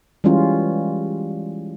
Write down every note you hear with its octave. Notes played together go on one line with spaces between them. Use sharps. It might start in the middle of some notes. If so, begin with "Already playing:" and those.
E3 G3 G#3 C#4 F4